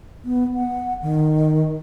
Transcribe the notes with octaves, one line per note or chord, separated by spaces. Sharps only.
B3
F#5
D#3